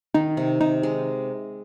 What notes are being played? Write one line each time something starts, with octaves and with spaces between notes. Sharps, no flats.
D#3 D#4
C3
C3 D#4
G#3